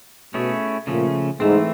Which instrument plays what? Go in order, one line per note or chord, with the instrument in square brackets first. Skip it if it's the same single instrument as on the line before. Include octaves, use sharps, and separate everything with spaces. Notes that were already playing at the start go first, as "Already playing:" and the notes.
[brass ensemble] B2 [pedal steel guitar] A3 C#4 E4 G#4 C#5
[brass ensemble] A#2 [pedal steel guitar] C#3 F3 A3 C#4
[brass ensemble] G#2 [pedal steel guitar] E3 A3 C4